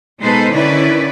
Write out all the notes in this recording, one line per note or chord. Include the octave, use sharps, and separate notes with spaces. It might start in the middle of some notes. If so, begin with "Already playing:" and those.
B2 G#3 D#4 A4 B4 C5
D3 D#3 C#4 E4 B4 D5